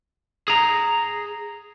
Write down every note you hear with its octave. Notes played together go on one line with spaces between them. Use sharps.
G#4 A#5